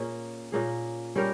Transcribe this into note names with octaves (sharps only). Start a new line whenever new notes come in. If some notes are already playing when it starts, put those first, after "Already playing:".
Already playing: A#2 A#3 C#4 G#4
A#2 A#3 C#4 G#4
G3 C#4 G4 A#4